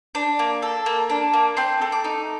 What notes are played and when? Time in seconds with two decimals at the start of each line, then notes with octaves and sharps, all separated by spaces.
0.15 D4
0.39 A#3
0.62 A4
0.86 A#3
1.10 D4
1.33 A#3
1.57 C4 C6
1.81 A3
1.92 D6
2.04 D#4